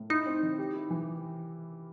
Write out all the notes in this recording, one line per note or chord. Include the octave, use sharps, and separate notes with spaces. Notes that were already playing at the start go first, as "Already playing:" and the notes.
Already playing: A2
D#4 E4
C4
D#3
G4
E4
E3